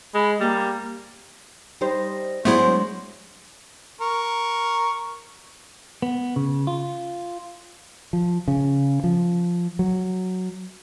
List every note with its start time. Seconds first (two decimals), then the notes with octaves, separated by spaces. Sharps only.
0.14 G#3 B5
0.40 G3 A#3
1.81 G3 D#4 C5
2.45 F#3 G#3 A3 B3 D4 E4 C5
4.01 A#4 C#6
6.02 B3
6.36 C#3
6.67 F4
8.13 F3
8.48 C#3
9.04 F3
9.79 F#3